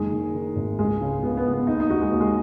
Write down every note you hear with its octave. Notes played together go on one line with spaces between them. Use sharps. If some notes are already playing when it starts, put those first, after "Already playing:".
Already playing: F#1 D#3 G#3
D#3
D#3
G#1
C#2 G#3
C#3
C#2 B3
B3
C#2
B3
D#2 D#4
D#4
D#2 F#4
G#3
D#2
G#3